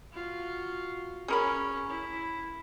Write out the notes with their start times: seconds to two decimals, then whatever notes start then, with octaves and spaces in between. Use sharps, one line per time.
0.13 F4 F#4
1.28 C#4 G#4 A#4 B5
1.90 E4